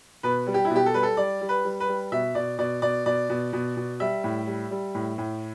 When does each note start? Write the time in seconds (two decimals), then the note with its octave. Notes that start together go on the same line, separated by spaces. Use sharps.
0.23 B2 B4
0.47 G3
0.54 G4
0.65 E4
0.70 B2
0.75 G4
0.86 A4
0.94 G3 B4
1.03 A4
1.17 G3 D5
1.41 G3
1.49 B4
1.64 G3
1.80 B4
1.88 G3
2.12 B2 E5
2.35 B2 D5
2.58 B2 D5
2.82 B2 D5
3.06 B2 D5
3.29 B2
3.53 B2
3.77 B2
4.00 G3 E5
4.24 A2
4.47 G3
4.71 G3
4.95 A2
5.18 A2